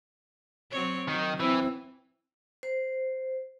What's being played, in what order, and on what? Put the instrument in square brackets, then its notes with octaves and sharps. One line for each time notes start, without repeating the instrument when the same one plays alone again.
[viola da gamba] F#3 C4 C#5
[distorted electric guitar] D#3 [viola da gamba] F#3
[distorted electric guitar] E3 [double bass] C4 E4
[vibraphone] C5